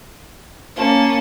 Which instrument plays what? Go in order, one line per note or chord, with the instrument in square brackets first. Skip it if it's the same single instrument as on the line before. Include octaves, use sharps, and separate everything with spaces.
[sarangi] A#3 [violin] C#4 A5